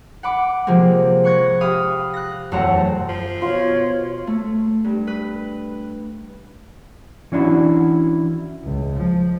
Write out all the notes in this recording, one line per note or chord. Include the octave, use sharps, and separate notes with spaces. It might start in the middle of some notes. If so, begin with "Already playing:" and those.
F#5 B5 D6
C3 F3 G#3 A#3 C4
B5 C#6 F#6 G#6 A#6
G4 F5 B5 D#6
F#6 A#6
E1 F#2 A3 C5 F#5 A#5
F3
B2 F4 C#5
A3
G2
B4
E3 C#4 D4 E4 F#4
C#2
F3